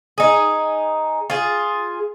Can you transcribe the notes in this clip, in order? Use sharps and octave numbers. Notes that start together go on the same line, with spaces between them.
D#4 G#4
F4 G#4